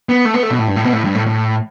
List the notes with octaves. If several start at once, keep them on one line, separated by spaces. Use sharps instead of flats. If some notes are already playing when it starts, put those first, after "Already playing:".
B3
A3
B3
A3
B2
A2
G2
A2
B2
A2
G2
A2
A2